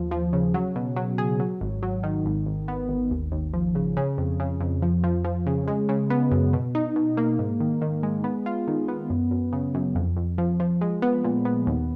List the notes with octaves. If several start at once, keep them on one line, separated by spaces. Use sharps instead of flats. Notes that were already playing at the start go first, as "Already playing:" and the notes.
Already playing: D#2 F3
F3
C#3
F#3
B2
F#3
G#4
F#3
G#1
F#3
D#3
G#1
G#1
B3
G#1
D#2
D#2
F3
C#3
C#3
F2
C#3
F2
F3
F3
F3
C#3
G#3
C#3
B3
F#2
B2
D#4
B2
A#3
G#2
D#3
D#3
G#3
B3
F4
D#3
B3
F#2
F#2
C#3
F#2
F2
F2
F3
F3
G#3
B3
A#2
B3
D#2